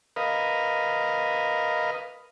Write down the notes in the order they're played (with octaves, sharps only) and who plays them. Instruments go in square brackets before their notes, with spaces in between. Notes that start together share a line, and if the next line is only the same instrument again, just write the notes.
[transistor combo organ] A#4 B4 D#5 F5